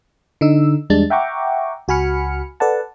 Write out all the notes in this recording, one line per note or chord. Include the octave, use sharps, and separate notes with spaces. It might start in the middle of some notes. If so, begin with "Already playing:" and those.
D3 D#4 E6
E2 G3 G#3 D4 A6
E5 F#5 G5 A#5 C#6 D6
C#2 F#4 G#5 B5 F6 C#7
A4 B4 D5 F#5 A5